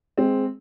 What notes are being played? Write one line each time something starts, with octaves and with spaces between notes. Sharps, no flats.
G#3 C4